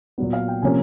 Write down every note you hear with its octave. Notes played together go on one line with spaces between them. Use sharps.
A#2 F#3 B3
F5
G5
C3 F3 A#3 C#4 G#5